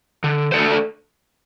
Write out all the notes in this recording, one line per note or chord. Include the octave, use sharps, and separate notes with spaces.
D3
A3 D4 A4 C5